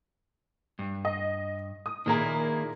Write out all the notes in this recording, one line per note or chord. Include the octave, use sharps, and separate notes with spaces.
G2
D#5
D#6
A#2 D#3 A#3 E4 G#4 A#4